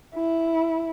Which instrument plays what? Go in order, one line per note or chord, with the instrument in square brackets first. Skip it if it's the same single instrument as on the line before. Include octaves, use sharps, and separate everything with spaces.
[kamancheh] E4